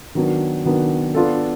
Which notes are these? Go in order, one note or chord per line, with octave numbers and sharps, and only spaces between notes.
D#3 F#3 B3 D4
D#3 F#3 B3 D4
B3 D4 F4 A4